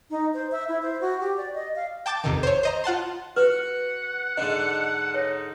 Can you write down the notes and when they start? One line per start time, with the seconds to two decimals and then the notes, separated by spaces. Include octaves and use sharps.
0.10 D#4
0.34 C5
0.51 E5
0.68 E4
0.82 C5
1.01 F#4
1.20 G4
1.37 D5
1.54 D#5
1.75 F5
2.06 G5 A5 D6 G6 A6
2.24 A1 F2 C3 D#3
2.43 C5 C#5
2.63 C5 D#5 A#5
2.84 F4 F#5 A5 C6
3.36 F#4 B4 F#5
4.37 G#2 D3 D4 D#5
5.14 D#4 C#5